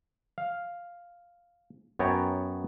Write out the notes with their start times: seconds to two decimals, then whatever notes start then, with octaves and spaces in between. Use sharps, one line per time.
0.38 F5
1.99 F#2 B3 C#5 G5 A5 A#5